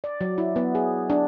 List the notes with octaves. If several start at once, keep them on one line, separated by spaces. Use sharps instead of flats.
D5
F#3
E4
B3
G#4
D4